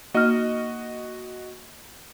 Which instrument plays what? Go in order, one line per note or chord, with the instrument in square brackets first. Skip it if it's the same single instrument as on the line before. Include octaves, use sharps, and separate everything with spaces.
[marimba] A#3 D#4 F6 [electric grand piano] F#4 D#5